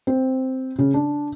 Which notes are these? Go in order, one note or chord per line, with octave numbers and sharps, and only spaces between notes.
C4
C#3
D4